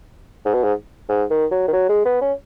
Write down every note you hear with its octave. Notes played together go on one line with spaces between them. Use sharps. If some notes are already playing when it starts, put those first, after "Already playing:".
G#2
B2
G#2
G#2
D#3
F#3
D#3
F#3
G#3
B3
C#4